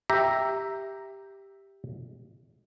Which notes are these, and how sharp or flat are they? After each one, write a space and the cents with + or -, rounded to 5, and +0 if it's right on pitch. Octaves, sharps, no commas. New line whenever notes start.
G4 +0 E5 +0 A#5 +0